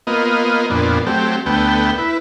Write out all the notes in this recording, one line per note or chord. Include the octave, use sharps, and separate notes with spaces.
A#3 B3 F4 D#5
F2 A#2 B3 D4
F#3 A3 C4 G4
D2 A3 B3 G5
E4 B4